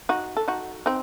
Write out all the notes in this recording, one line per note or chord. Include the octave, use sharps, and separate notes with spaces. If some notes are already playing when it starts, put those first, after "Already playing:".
D#4 F#4
A4
D#4 F#4
C4 D#4